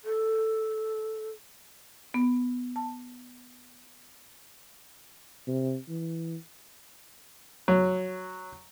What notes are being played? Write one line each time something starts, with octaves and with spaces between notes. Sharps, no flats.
A4
B3
A5
C3
E3
F#3